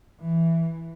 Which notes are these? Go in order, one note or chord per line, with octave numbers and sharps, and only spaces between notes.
E3